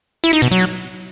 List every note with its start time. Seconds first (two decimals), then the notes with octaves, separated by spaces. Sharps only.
0.24 E4
0.33 D#4
0.42 B2
0.51 F#3